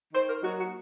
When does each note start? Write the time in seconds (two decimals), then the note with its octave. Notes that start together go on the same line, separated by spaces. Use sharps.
0.13 D#3 C5
0.29 A#4
0.42 F#3 A#3 D#4 F#4
0.57 F#4